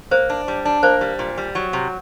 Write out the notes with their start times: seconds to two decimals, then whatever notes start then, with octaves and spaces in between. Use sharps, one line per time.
0.11 A#3 C5
0.30 D4
0.48 G3
0.65 D4
0.83 A#3 C5
1.01 G3
1.19 A#2
1.38 G3
1.55 F#3
1.73 C3